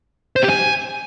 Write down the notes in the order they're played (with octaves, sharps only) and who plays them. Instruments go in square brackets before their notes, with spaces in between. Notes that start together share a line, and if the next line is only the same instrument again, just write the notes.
[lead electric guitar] C5
G4
G#5